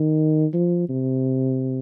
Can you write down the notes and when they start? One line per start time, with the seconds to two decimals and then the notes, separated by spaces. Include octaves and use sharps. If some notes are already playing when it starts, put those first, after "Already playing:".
Already playing: D#3
0.53 F3
0.89 C3